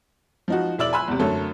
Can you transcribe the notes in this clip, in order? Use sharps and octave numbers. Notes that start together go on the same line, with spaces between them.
F3 D#4 F#4
E1 E4 D5 E6 F#7
G#5 B5 C6 E6 F#6
E2 C3
F#2 D3 A3 A4 C#5